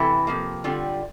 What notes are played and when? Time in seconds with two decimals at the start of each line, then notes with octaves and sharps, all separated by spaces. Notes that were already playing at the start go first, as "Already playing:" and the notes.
Already playing: C3 E3 E4 A4
0.27 C3 F3 A#3
0.64 D3 G3 C4 F4